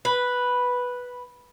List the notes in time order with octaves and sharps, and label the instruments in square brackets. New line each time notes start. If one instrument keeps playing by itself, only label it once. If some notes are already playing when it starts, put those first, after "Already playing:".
[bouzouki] B4